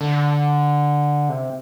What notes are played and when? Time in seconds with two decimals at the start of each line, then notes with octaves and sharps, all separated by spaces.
0.01 D3
1.29 C3